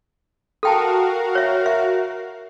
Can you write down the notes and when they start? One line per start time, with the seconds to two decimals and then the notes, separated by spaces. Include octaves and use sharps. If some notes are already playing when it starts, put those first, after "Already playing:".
0.63 F#4 A4 A#4 F5 G5 A5
1.35 C#5 E5
1.66 E5